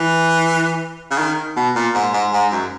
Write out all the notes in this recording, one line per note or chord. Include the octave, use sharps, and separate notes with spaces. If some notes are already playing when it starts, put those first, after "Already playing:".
Already playing: E3
C#3
D#3
B2
A#2
G#2
G#2
G#2
F#2